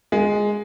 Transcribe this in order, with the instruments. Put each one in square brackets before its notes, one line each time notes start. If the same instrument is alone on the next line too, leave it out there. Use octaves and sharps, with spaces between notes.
[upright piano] G#3